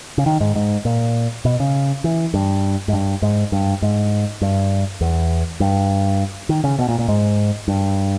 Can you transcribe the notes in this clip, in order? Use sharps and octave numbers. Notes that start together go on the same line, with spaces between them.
C#3
D#3
G#2
G#2
A#2
B2
C#3
E3
G2
G#2
G2
G#2
G2
G#2
G2
E2
G2
D#3
C#3
B2
A#2
A#2
G#2
G2